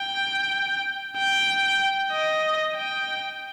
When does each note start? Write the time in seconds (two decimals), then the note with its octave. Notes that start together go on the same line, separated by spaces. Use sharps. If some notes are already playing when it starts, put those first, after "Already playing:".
Already playing: G5
1.17 G5
2.12 D#5
2.75 G5